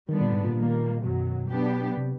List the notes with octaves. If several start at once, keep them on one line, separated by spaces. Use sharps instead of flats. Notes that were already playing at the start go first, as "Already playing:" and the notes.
D3 D#3 G3 B3 D4
A#2
G#2
A#2
D#3 G3 A#3
F#2 B2 D#3 F#3
F#3 B3 D4 G4
C3